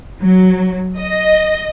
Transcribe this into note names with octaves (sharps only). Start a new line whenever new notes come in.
F#3
D#5